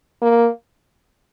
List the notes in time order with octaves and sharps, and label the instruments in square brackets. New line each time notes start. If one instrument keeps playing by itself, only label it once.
[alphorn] A#3